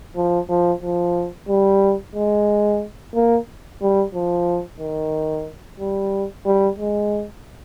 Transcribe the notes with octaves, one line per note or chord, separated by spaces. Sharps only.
F3
F3
F3
G3
G#3
A#3
G3
F3
D#3
G3
G3
G#3